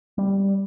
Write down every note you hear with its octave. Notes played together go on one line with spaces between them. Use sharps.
G3